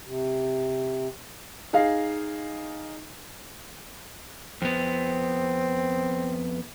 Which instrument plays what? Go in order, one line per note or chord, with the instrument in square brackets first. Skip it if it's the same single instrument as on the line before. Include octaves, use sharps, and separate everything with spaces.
[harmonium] C3
[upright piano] D#4 G#4 F5
[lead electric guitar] F2 B3 [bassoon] C4